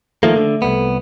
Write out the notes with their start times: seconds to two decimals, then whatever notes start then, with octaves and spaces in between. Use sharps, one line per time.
0.23 D#3 F3 A3 A#3
0.36 D3
0.62 C2 B3